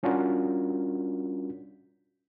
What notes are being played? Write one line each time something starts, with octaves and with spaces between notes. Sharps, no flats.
G3 C#4 D4 F4 F#4 A#4